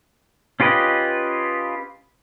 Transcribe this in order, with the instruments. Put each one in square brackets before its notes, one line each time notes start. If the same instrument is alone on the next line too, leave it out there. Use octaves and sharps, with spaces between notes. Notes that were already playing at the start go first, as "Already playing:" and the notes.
[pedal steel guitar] C#4 F4 G4 B4 D#5